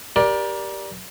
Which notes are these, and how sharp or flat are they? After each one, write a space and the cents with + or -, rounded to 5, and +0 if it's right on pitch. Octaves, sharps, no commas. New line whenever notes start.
G4 +0 A#4 +30 D5 +0